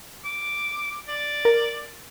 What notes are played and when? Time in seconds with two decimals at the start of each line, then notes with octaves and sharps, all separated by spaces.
0.25 D6
1.08 D5
1.45 A#4